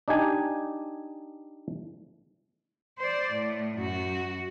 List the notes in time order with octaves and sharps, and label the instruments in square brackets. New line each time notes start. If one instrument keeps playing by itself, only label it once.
[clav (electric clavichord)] D4 D#4 G4 G#5
[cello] C5 D5
A2
F#2 F#4